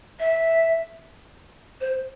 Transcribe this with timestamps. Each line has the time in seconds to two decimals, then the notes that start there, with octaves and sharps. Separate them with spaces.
0.20 E5
1.81 C5